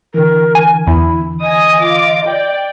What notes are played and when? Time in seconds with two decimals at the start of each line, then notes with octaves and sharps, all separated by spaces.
0.14 D3 E3 A#4
0.55 G#5
0.87 E2 E4
1.41 D#5 G#5 D#6
1.81 F4 D6
2.27 D5 G5